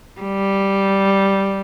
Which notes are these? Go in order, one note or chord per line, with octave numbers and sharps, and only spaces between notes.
G3